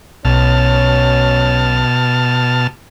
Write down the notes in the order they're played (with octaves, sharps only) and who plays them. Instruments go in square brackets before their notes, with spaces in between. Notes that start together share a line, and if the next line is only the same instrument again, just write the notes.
[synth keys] B1 [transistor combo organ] B2 A5 F6 [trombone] C#4